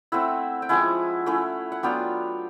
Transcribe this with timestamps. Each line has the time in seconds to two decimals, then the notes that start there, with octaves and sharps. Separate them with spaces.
0.12 A3 C4 E4 E5 F#5
0.62 G5
0.69 F3 G#3 C#4 E4 F#5 G#5
1.26 A3 C#4 E4
1.72 F#5
1.83 F#3 B3 D4 F4 F5 G5